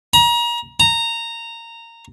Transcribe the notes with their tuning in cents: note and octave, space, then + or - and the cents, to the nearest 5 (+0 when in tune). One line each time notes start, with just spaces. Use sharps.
A#5 +30
A#5 -15